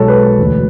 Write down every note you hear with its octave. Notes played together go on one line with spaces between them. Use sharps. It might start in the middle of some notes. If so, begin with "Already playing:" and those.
Already playing: B1 B2 G#3 A4 C#5
B4
E1 D2 D3